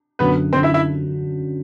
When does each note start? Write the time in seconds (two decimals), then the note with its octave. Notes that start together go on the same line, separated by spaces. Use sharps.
0.19 F#2 D3 F#3 B3 B4
0.53 F#2 D3 F#3 C4 C5
0.63 E4 E5
0.74 E4 E5